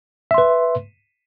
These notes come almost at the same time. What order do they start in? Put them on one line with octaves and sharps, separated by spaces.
E5 C6 B4